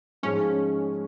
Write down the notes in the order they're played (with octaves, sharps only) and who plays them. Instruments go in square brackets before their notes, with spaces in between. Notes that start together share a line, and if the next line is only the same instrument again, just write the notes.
[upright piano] G#2 F3 G#3 D#4 [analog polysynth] C#4